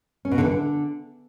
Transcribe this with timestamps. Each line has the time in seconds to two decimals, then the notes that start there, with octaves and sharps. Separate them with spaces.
0.25 C#4
0.31 B2
0.38 D3
0.45 E3
0.51 D3